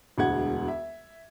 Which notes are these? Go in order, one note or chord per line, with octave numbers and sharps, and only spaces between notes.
E1 D2 G#3 F#5 G#6
E5